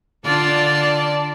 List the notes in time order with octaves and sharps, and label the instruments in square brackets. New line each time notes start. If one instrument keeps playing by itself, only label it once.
[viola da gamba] D3 D4 F4 [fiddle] D5 A5